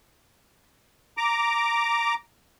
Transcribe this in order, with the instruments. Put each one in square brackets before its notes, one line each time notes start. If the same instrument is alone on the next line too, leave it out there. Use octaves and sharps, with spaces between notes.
[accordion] A#5 D6